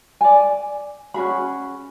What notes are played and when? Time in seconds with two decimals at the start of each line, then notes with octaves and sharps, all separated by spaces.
0.21 D5 G#5
1.14 C#4 F#4 G#4 B5